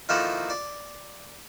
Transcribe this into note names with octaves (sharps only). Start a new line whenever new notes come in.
D#3 F3 A#3 E4 F#4 A4
D5